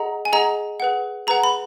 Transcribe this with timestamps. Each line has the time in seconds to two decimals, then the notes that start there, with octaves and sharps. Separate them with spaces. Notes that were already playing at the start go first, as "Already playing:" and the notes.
Already playing: G#4 D#5 F#5 A#5
0.25 G#5
0.33 G#4 D#5 F#5 A#5
0.80 G#4 B4 F#5
1.27 G#4 B4 F#5 A#5
1.44 B5